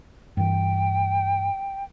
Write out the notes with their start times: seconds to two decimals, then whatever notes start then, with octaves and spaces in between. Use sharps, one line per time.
0.37 G2 E3 G5